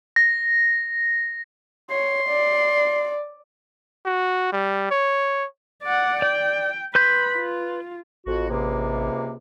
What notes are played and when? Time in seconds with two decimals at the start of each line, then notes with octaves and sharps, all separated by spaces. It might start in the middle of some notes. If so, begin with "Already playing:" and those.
0.16 A#6
1.90 C#5 C6
2.29 D5
4.05 F#4
4.52 G3
4.91 C#5
5.83 D5 F#5
6.22 D5 G5
6.95 B4 B5 C6 G6
7.36 F4
8.26 A1 F2 F#4
8.49 C#2 C3 A#3